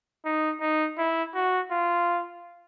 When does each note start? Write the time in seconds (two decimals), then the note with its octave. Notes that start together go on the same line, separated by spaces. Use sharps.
0.25 D#4
0.61 D#4
0.98 E4
1.35 F#4
1.71 F4